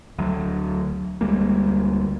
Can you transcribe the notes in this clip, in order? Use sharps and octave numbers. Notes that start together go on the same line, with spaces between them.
D2 F#3
D2 G3 G#3 A#3